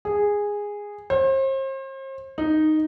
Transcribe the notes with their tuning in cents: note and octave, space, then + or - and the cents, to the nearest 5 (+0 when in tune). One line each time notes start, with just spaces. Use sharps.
G#4 -10
C5 +40
D#4 -5